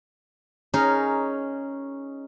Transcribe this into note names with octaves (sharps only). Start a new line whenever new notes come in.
C#4 D#4 G#4 A#4